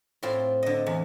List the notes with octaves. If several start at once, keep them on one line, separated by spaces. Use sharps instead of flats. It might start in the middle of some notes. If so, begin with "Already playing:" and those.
A2 C4 F4
D3 D#5
E2